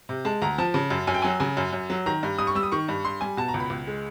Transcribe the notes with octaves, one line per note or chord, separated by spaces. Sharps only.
C3
G#3 A5
D2 A#5
F3 A5
C#3
F#2
F#2 G#5
G5
F#3 G#5
C#3 G#5
F#2
F#2
F#3
D#3 A#5
G2
G2 D#6
C#6
G3 E6
D#6
D#3 C#6
G2
G2 C6
G3 G#5
B2 A5
A#5
C#2
B5
C#2
G#3